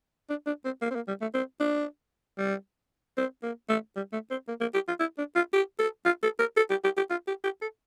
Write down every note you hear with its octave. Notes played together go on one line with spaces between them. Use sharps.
D4
D4
C4
A#3
C4
A#3
G3
A3
C4
D4
G3
C4
A#3
A3
G3
A3
C4
A#3
A#3
G4
F4
E4
D4
F4
G4
A4
F4
A4
A#4
A4
G4
G4
G4
F4
G4
G4
A4